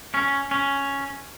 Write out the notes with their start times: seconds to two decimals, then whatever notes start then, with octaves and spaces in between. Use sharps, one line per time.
0.14 C#4
0.51 C#4